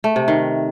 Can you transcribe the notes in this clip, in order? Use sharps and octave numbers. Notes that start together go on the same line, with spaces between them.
A3
C3
D#3